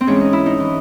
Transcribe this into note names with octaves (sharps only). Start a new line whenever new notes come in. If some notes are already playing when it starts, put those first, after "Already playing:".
C4
G#2 E3 C#4
D#4
E4
D#4
E3